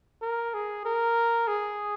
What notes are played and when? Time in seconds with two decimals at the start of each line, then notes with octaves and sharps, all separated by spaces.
0.22 A#4
0.54 G#4
0.85 A#4
1.47 G#4